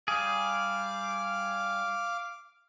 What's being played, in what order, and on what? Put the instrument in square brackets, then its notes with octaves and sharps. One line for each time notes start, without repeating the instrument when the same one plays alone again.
[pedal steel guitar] G3 G#4 [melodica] F5 D6